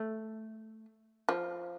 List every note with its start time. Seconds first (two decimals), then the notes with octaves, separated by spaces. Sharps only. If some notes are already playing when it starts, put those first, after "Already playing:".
Already playing: A3
1.29 F3